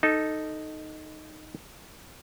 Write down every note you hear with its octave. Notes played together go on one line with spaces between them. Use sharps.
D#4 A4